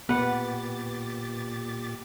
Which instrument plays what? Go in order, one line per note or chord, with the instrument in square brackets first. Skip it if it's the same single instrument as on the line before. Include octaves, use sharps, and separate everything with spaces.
[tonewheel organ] A#2 G4 A6 [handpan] B3 [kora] B4 F#5